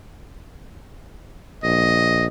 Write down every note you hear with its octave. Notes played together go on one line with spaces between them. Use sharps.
A#1 D#5